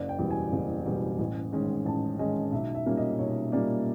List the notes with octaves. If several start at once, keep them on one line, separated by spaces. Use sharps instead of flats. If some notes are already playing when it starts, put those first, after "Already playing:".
Already playing: F#1 D5
G5
E2 B2 G3
G#5
F#1
E2 B2 G3
A1
G#2 D#3 G#3 C#4
A1 A5
G#2 D#3 G#3 C#4 D#5
B1 E5
E5
A#2 G3 A#3 C#4
D#5
B1 C#5
A#2 G3 A#3 C#4 D5